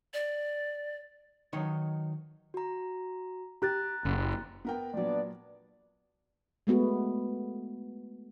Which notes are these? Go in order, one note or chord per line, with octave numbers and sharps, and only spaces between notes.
D5
D#3 F#3 D#4 C#5
F#4 A#5
G4 A#5 F#6 A6
F#1
B3 A#4 G5
A#2 F#3 B3 D4 D5
G#3 A3 B3 F#4